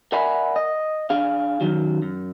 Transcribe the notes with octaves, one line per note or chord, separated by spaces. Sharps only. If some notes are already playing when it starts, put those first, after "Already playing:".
A#4 D5 E5 F#5 G#5 B5
D#5
D4 G#4 F5
F#2 B2 D#3 F#3
F#2